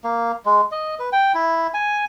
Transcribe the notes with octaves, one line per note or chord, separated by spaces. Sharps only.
A#3
G#3
D#5
B4
G5
E4
G#5